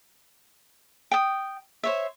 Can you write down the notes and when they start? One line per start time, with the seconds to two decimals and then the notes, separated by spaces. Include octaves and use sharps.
1.11 G5 D#6
1.83 C5 C#5 E5